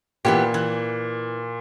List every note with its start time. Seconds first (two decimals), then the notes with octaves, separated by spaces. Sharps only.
0.25 A#2 E3 B3 G4
0.54 E3